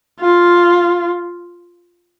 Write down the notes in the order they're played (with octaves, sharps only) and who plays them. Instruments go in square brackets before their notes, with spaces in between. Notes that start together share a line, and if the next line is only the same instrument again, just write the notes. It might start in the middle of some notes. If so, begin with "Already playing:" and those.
[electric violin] F4